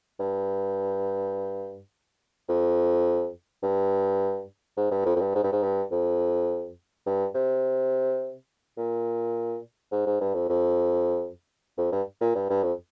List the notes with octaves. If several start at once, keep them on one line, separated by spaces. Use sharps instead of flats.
G2
F2
G2
G#2
G2
F2
F2
G2
G#2
G2
G#2
G2
F2
G2
C3
A#2
G#2
G#2
G2
F2
F2
F2
G2
A#2
G2
G2
F2